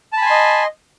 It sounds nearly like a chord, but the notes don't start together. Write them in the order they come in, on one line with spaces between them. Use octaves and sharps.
A5 B5 G#5 C6 D#5